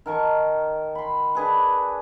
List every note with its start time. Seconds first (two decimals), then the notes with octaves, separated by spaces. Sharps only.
0.06 D#3 A#4 A5 C#6
0.95 B5 C6
1.35 D4 G#4 B4